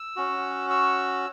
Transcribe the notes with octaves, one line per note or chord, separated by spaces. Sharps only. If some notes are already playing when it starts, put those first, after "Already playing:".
Already playing: E6
C#4 F#4
E6